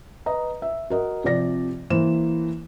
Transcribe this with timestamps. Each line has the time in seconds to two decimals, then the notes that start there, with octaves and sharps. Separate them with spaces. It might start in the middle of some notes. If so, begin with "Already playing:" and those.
0.26 B4 D#5 A#5
0.62 E5
0.90 F#4 A#4 D#5
1.24 C3 F3 C4 D5 A#6
1.90 E3 A#3 E4 C5 E7